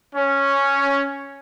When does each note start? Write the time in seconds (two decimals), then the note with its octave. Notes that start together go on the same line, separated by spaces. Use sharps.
0.15 C#4